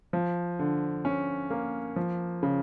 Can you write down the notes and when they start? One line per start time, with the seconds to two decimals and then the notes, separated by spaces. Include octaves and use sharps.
0.13 F3
0.59 D3
1.05 C#4
1.50 A#3
1.96 F3
2.43 C#3